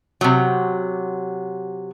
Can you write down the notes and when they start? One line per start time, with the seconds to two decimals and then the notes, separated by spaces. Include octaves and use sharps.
0.21 C3 F#3